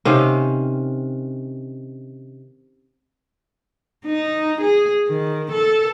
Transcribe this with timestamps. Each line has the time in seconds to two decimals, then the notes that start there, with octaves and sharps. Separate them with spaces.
0.05 C3 D#3 C#4 F5
4.06 D#4
4.61 G#4
5.08 D#3
5.52 A4